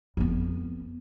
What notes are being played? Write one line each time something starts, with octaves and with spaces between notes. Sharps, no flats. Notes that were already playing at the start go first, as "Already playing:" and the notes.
F2 B3